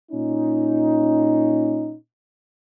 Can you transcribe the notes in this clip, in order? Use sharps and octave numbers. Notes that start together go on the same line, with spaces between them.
A#2 C#4 D#4